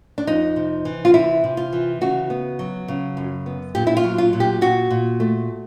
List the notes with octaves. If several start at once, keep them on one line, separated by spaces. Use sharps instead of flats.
D4
F2 D#4
C3
E3
F4
C3 E4
C3
F4
E3
C#3 F#4
B3
F#3
C#3
F#2
B3
A#2 G4
E4
F4
F#3
F4
A#2
G4
A#2 F#4
A#2
A3